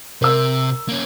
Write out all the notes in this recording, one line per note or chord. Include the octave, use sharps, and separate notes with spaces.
C3 A#4 E6
A#3 C#4